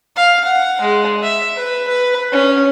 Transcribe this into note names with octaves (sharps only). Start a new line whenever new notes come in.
F5
F#5
G#3
E5
B4
B4
C#4